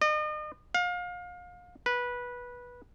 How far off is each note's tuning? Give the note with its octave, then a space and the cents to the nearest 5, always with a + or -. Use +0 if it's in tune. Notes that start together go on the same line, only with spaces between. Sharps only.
D#5 -40
F5 +30
B4 -15